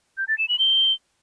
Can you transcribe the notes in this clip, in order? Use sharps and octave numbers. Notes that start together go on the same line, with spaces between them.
G6
A6
E7
F#7
G7